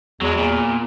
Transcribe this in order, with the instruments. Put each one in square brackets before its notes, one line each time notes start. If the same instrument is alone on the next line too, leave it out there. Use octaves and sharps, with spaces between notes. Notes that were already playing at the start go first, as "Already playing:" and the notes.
[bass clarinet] E2 [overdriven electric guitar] F#3 G#3
[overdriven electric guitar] A#2